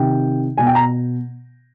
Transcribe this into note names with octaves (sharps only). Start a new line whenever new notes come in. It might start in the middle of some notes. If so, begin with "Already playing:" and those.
Already playing: C3 D#3 G5
B2 G#5
G5
A#5